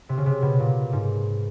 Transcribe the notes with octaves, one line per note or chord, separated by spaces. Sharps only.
C3
C#3
C3
B2
A#2
G#2